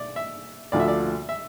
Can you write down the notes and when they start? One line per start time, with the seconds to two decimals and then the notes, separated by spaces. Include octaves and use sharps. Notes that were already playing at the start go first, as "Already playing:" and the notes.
Already playing: D5
0.16 E5
0.72 D2 D3 F3 D5
0.80 E5
0.88 D5
1.29 E5